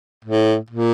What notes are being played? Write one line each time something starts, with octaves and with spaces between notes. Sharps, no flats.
A2
A#2